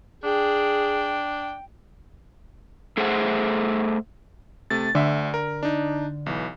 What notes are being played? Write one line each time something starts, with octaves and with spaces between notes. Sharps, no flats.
D4 G#4 G5
A3 G#4 A4 C5 E5 F#5
C3 A3 A6
D2 D3 E5
A#4
D4 D#4
B1 E3